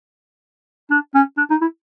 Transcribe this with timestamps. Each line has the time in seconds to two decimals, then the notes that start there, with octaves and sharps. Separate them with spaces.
0.90 D4
1.15 C#4
1.37 D4
1.50 D#4
1.61 E4